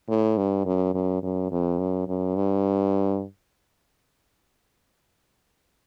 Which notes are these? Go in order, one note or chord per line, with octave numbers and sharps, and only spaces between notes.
A2
G2
F#2
F#2
F#2
F2
F#2
F#2
G2